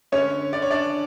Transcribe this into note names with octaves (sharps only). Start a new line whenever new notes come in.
D3 C#4 C#5
D3 D5
C#5
D4 D5